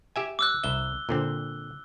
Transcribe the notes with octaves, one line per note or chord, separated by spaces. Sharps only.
G4 E5 G#5
D6 E6 F#6
C2 E5 G7
A#2 D3 C4